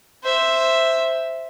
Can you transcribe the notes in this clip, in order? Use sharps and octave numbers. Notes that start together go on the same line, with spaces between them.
C5 E5